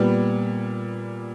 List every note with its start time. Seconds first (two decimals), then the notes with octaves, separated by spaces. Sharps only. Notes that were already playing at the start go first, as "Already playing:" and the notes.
Already playing: A#2 G3 B3